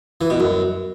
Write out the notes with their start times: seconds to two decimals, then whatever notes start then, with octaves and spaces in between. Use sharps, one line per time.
0.21 E3
0.30 B2
0.40 F#2